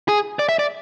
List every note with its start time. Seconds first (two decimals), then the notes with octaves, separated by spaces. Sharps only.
0.08 G#4
0.39 D5
0.49 E5
0.59 D5